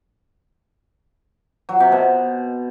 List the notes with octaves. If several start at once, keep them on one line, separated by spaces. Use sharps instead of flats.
F#3
C3
B2